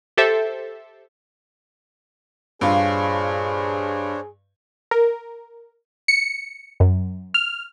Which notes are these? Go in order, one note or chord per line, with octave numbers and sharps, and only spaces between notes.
G4 A4 C5 E5
G2 A#2 D4 F4 G#4 C5 C#5
A#4
C#7
F#2
F6